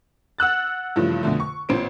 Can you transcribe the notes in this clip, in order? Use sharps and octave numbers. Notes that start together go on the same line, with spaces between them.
F#5 E6 F#6 A6
G2 C#3 E3 F3 A3
F2 B2 D3 A3
C#6
A1 A#2 C4 C5 C#5 D7